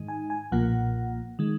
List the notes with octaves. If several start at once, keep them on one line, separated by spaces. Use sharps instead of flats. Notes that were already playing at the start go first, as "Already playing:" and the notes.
Already playing: G#2 D#3 G#3 D#4
G#5
G#5
B1 A#2 F3 A#3 F#5
D#3 G#3